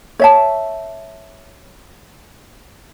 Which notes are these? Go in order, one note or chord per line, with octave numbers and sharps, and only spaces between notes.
C#5 E5 A5